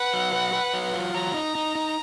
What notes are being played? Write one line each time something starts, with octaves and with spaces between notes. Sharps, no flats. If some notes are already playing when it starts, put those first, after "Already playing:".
Already playing: B4 F#5
F#3
B4
B4
F#3
F4
F#3 A#5
D#4
D#4
D#4